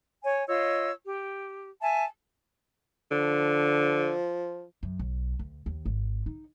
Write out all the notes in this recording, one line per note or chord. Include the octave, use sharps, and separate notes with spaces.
C#5 G#5
F4 C#5 D#5 E6
G4
E5 G#5 A5
D3 F3
F#2
B1
D2
D#2
G#1
D#4